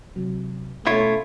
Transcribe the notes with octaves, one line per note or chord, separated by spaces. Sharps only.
C3 F#3
B2 A3 C#4 E4 F4 C#5